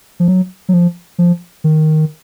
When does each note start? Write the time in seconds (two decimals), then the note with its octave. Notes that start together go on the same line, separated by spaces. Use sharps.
0.20 F3
0.28 F#3
0.69 F#3
0.74 F3
1.18 F3
1.64 D#3